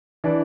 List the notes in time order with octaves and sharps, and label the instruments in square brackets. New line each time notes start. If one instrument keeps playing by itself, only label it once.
[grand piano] E3 D4